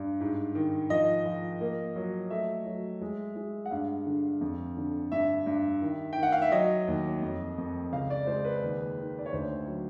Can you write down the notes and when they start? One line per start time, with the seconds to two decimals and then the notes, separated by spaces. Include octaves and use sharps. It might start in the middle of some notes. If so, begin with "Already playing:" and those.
Already playing: G2
0.20 G#2
0.55 D#3
0.90 F3 D#5
1.25 F3
1.61 A#3
1.96 F#3
2.30 A3 E5
2.66 F#3
3.02 G#3
3.36 G#3
3.66 F#5
3.71 G2 F5
4.06 D3
4.41 F2
4.77 D3
5.12 G2 E5
5.46 G2
5.81 D#3
6.13 D#3 G5
6.23 F#5
6.32 F5
6.42 E5
6.52 F#3 D#5
6.87 D#2
7.21 F2
7.58 F2
7.93 C#2 F5
8.10 D5
8.27 G#3 C5
8.45 B4
8.62 D#2
8.98 D#3
9.19 D5
9.26 C#5
9.32 D2 C5
9.68 F#3